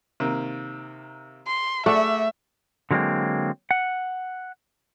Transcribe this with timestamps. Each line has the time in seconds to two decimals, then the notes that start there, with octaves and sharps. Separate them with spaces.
0.20 C3 D#3 A#3
1.47 C6
1.86 A3 G#4 D5 E5 F#5
2.91 D3 F#3 G#3 A#3 C4
3.71 F#5